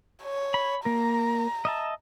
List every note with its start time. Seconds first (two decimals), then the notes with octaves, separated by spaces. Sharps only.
0.23 C#5
0.54 B5
0.85 A#3 A#4 A#5
1.65 D#5 E5 A5